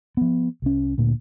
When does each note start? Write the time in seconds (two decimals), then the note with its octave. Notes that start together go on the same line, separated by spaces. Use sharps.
0.17 F3 B3
0.62 C2 C#4
0.98 D2 A#2